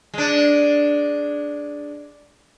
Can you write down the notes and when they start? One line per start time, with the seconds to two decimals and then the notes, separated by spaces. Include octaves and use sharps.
0.14 G#3 D4